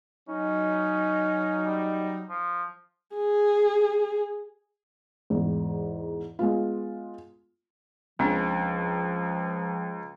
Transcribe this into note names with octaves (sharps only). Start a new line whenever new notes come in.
F#3 C#4 D#4
G3
F3
G#4
E2 G#2
G#3 B3 F4
C#2 F3 C4 D4